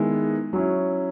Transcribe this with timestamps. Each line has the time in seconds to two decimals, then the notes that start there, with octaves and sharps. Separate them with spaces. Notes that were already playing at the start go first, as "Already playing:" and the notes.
Already playing: D#3 G#3 B3 E4
0.53 F#3 C#4 E4